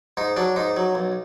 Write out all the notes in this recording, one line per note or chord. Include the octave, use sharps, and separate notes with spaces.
G#2 D#4
F#3 D4
G#2 D#4
F#3
B1